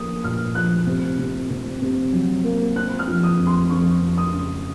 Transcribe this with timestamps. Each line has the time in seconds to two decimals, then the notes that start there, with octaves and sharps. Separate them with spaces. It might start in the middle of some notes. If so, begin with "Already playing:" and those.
Already playing: F3 A#3 C#4 D#6
0.24 A#2 F6
0.55 F3 F#6
0.87 C3
1.19 C3
1.50 C3
1.82 C3
2.13 F#3
2.44 A#3
2.76 C4 F#6
2.99 F6
3.08 F3
3.23 D#6
3.39 F2
3.47 C6
3.70 F2 C#6
4.02 F2
4.18 D#6
4.33 C#3